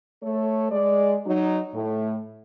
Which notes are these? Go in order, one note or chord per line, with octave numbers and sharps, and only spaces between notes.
A3 A4 C#5
G#3 D5
F#3 D#4
A2